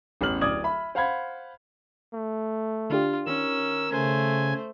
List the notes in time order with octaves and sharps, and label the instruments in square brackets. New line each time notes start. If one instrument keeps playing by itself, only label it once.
[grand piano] A1 E2 C#4 F6 F#7
D1 D5 D6 D#6 G#6 F#7
E5 B5
C5 F5 F#5 B5 G#6
[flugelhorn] A3
[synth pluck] D3 D4 G4 [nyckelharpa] F4
[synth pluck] D#3 [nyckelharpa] C#4 [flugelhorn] A#4 [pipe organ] E6
[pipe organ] C#3 G#5 [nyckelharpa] A3 C5